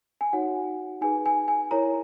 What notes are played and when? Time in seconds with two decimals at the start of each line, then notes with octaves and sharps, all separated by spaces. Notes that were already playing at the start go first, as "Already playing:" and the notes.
0.21 G#5
0.33 D#4 F#4 C#5 F#5
1.01 D#4 G#4 B4 G#5
1.26 G#5
1.48 G#5
1.71 E4 A#4 C#5 A#5